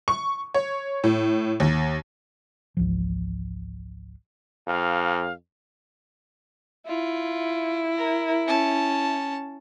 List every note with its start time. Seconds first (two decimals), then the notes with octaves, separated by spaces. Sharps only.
0.08 C#6
0.54 C#5
1.04 A2
1.60 D#2
2.77 G#1 C#2 E3 F3
4.67 F2 F5
6.87 E4 F4
7.98 A#4
8.46 C#4 A5